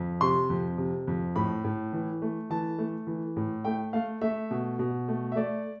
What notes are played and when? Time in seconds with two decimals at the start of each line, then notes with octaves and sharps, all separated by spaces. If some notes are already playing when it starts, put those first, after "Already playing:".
Already playing: F2
0.21 C3 C6
0.50 F2
0.78 C3
1.07 F2
1.36 A2 B5
1.64 A2
1.93 E3
2.22 A3
2.50 E3 A5
2.79 A3
3.07 E3
3.37 A2
3.65 A3 G5
3.93 A3 F5
4.21 A3 E5
4.51 B2
4.79 B2
5.08 A3
5.32 E5
5.36 A3 D5